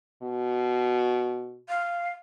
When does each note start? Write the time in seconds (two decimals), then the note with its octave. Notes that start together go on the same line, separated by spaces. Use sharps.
0.22 B2
1.69 F5